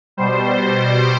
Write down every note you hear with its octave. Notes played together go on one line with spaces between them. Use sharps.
B2 G3 C5